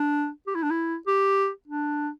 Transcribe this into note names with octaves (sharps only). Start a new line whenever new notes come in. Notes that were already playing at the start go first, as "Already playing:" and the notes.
Already playing: D4
G4
E4
D4
E4
G4
D4